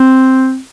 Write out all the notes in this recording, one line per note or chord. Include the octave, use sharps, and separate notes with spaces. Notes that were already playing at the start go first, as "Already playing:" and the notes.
Already playing: C4